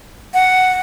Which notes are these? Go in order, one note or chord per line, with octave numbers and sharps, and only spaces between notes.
F#5